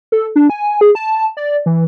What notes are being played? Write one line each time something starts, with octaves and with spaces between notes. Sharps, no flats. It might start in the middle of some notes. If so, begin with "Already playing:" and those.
A4
D4
G#5
G#4
A5
D5
E3